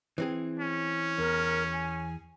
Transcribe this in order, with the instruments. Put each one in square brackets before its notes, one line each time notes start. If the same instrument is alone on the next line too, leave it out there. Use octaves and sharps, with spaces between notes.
[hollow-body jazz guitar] E3 C4 G#4
[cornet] C#4
[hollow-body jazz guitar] E2 [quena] A#4
[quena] G#5